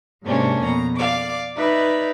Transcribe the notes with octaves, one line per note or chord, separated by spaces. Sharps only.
G#2 C3 A#3 C#4 D4
F2 B2 A#5
D5 F5 D6
D#4 B4 D5 E5